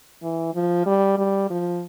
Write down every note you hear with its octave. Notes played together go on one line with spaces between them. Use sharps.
E3
F3
G3
G3
F3